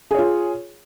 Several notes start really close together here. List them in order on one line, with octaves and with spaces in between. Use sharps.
G#4 C#5 F4